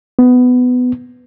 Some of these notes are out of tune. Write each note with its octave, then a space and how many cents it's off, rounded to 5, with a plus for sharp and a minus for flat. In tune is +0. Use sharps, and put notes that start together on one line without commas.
B3 +15